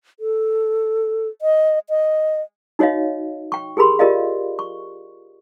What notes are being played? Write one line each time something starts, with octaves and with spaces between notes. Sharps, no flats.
A4
D#5
D#5
D#4 F#4 C#5 D#5 F5
G5 C#6
G4 G#4 A#4 B5 C6
F4 G4 A#4 D5 D#5 F5
C#6